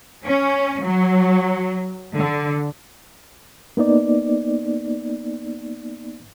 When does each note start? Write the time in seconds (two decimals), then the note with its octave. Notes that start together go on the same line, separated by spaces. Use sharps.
0.27 C#4
0.83 F#3
2.16 D3
3.77 A#3 B3 D#4 D5